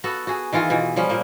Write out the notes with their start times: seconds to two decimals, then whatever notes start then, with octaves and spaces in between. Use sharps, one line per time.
0.04 B3 F#4 A4
0.27 F#4 G#4
0.53 D#3 E3 F4 G#4
0.70 B2 E3
0.96 F3 G3 C#4
1.09 A#2 A#3